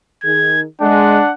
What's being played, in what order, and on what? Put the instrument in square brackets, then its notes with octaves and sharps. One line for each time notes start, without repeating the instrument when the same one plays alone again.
[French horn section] D#3 G#4 [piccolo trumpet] G#6
[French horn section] G#3 [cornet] D4 [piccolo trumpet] F#5